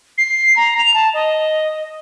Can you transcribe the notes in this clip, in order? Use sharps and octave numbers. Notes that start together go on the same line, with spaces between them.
C7
A#5
F7
A5
D#5